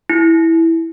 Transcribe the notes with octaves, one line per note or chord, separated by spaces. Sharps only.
E4